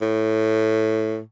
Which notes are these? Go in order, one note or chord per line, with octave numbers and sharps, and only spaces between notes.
A2